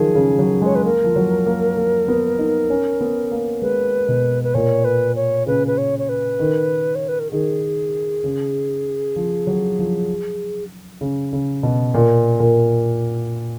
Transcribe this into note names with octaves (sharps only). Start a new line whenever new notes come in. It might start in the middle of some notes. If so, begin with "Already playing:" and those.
Already playing: D#3 F3 F#3 G#4
C#3
F#3
G#3 C#5
B4
A#3 A#4
F3
F#3
A#3
A#3
B3
D#4
C#4
B3
A#3
G#3 B4
B2
B4
A#2 C#5
B4
C#5
C#3 B4
B4
C#5
C#5
B4
D#3
C#5
B4
A#4
D#3 G#4
C#3
F3
F#3
F3
C#3
C#3
B2
A#2
A#2